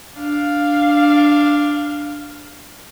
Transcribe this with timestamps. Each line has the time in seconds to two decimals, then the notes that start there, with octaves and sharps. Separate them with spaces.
0.15 D4 F5